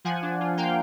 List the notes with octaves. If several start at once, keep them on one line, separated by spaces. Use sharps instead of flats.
F3 F#5 G#5
D4
F4
A#3 F5 G5